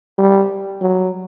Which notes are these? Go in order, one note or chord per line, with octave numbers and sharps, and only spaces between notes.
G3
F#3